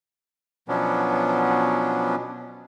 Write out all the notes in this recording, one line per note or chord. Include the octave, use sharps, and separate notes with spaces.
B2 F3 F#3 B3 C#4 D4